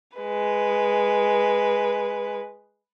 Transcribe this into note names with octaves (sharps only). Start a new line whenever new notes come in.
G#3 B4